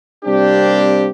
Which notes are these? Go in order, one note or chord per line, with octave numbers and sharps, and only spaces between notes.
C3 G3 A#3 C4 D4 G4